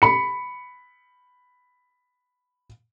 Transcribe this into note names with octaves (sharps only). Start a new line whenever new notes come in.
B5 C#7